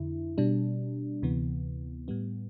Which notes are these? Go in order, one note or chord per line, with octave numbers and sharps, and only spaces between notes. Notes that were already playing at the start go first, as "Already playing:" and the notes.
Already playing: F2 D3 E4
B2 G3 D4
D2 C3 E3 B3
A2 G3 B3